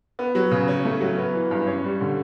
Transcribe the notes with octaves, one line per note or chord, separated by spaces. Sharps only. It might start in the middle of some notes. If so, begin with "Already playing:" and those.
B3
F#3
C#3
C#4
A3
F#3
B3
E3
G2
C#4
G3
D3